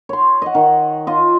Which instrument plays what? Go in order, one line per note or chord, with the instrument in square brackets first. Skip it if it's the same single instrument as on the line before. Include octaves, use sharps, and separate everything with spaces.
[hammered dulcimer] C#5 C6
D#5 F#5
D#3
F4 D#5